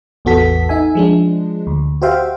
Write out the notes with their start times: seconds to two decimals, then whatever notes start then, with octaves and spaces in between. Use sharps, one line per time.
0.25 A1 E2 B3 F#4 A4 B6
0.69 D#4 E5 G#5
0.95 F3 G#3 D4
1.67 D2
2.02 F#4 G4 C5 E5 F5 G5